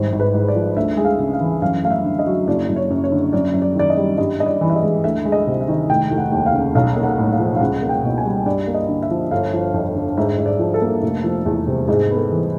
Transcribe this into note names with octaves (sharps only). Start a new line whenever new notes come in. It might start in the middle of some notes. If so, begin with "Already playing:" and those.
Already playing: G#1 G3 C5
G#1
B4
G#2
D5
F3
D2 E5
G#3
F5
C#3
F5
E3
F#2 F5
A3 F5
E5
D3
D#5
F#3
F#1 D5
F#1
C#5
F#2
C#5
D3
F#2 D5
F#2
D5
D#3 D5
D#5
G3
G2 D#5
G2 D#5
D5
E3
E5
D#5
G#3
D2 E5
G#3
D#5
C3
E5
D#3
F1 G5
F1
F#5
D#2
F5
C#3
B1 F5
A#3
F#5
A2
F5
F3
F5
C#2 F#5
A#3
G5
B2
G#5
G3
G2 D5
A#3
D#5
D3
E5
F3
G1 F5
F3
F2
D3
G#2 E5
G#2
D5
F3
A4
A#3
F1
F3
E2
C3
G#2 G#4
B3
A4
E3